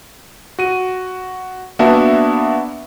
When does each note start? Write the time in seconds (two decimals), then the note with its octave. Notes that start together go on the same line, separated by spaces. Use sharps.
0.59 F#4 D#7
1.79 A#3 B3 D4 F#4 E5 A5